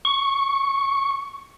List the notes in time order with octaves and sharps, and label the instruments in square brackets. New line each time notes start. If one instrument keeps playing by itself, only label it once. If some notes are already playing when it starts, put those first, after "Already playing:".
[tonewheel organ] C#6